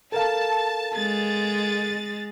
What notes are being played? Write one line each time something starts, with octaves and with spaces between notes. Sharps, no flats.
A4 A#4 F5 A5
G#3 A6